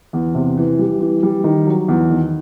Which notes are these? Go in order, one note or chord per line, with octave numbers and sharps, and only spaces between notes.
E2
C3
E3
G3
E3
G3
D#3
F#3
E2
D#3